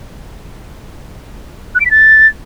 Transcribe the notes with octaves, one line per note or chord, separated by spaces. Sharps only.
F#6
D7
B6
A6